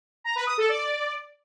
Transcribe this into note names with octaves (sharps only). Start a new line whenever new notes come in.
A#5
B4
D#6
A4
D5